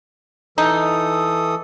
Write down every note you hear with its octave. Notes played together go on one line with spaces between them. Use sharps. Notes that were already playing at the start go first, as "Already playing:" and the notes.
E3 D#4 A4 D#6